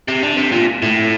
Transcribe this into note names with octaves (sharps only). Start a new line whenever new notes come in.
C3
D3
C3
A#2
A2